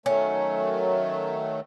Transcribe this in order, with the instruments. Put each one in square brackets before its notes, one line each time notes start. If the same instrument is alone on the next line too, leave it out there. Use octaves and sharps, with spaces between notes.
[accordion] D#3 F#3 A3 [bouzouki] C#4